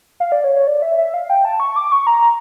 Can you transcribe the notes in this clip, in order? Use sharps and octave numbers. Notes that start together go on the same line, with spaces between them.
F5
D5
C#5
C#5
D5
E5
E5
F5
G5
A5
C#6
D6
C#6
A#5